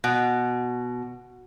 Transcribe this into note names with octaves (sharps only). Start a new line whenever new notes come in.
B2